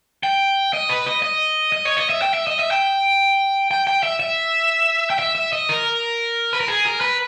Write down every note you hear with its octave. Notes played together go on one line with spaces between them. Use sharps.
G5
D#5
B4
D#5
D#5
D#5
C#5
D#5
E5
G5
E5
D#5
E5
G5
G5
G5
E5
E5
G5
E5
E5
D#5
A#4
B4
A#4
G#4
A#4
B4